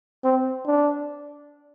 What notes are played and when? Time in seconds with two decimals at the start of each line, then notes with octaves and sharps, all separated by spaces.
0.24 C4
0.66 D4